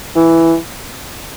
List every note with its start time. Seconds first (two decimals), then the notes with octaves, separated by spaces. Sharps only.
0.16 E3